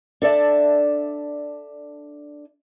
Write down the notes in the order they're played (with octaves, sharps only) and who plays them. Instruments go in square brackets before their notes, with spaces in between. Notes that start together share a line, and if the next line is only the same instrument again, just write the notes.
[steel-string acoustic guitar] D4 A4 D5 E5